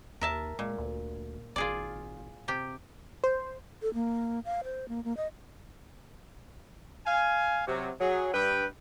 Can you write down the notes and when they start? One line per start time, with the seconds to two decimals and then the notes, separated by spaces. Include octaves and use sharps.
0.21 D#2 A#4 E5 A5
0.59 A#2 G#3
0.78 D2
1.56 G#1 F4 G#4 D5
2.48 C3 G4
3.24 C5
3.82 A4
3.94 A#3
4.45 F5
4.64 C5
4.89 A#3
5.04 A#3
5.17 D#5
7.06 F5 G#5
7.67 C3 F#3
8.00 F#3 G#4
8.33 G2 B4 G5